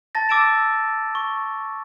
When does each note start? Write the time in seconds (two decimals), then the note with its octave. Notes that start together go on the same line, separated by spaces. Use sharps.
0.15 A5 A6 A#6
0.29 D6 E6 A6 D7 E7
1.15 C#6